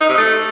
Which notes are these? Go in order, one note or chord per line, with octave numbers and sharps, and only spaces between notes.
D#4
C3
A3